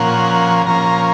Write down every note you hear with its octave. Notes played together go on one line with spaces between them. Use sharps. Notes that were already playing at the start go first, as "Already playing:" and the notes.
Already playing: A#2 F3 A#3 C#4 F#5
A#2 F3 A#3 C#4 A#5